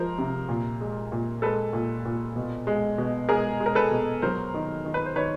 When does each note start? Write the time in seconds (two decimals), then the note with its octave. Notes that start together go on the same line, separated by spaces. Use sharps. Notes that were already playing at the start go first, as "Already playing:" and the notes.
Already playing: F3 G#3 A#4 C5
0.18 C3
0.49 A#2
0.81 G#3
1.12 A#2
1.42 G#3 A4 B4
1.73 A#2
2.05 A#2
2.36 B2
2.67 G#3
2.98 B2
3.29 G#3 G#4 A#4
3.60 G#3
3.66 A#4
3.75 A4 B4
3.91 B2
4.22 F#3 A#4 C5
4.54 D#3
4.85 D#3
4.94 B4
5.06 C5
5.16 D#3 B4 C#5